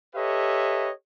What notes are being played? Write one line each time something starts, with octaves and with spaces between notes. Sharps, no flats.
G4 A4 B4 C#5 D#5 E5